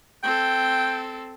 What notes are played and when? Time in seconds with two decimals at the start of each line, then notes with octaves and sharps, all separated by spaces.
0.23 C4 A4 G5